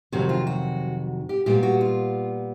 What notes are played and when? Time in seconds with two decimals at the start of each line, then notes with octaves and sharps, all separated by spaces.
0.12 F2 C3 D#3 F#3 F#4
0.29 F4
0.47 F#4
1.29 G4
1.46 A#2 G3 B3 G4
1.63 F#4
1.81 F4